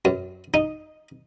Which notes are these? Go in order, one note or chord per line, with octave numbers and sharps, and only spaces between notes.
F#2
D#4